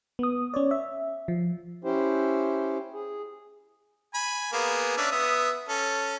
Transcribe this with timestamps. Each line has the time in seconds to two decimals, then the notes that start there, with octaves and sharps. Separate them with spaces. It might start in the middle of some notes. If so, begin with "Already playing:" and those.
0.19 B3 D#6
0.54 C#4 C#5 D5
0.71 E5
1.28 F3
1.84 C#4 E4 G4 C5
2.93 G#4
4.14 G#5 B5
4.53 A#3 B3 G#4
4.97 C#4 D4 E5
5.12 B3 E5 D#6
5.69 C#4 A4